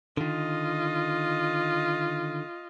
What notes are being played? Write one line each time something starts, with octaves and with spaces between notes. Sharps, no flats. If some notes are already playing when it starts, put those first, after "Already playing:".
D3 D#3 F4 D#5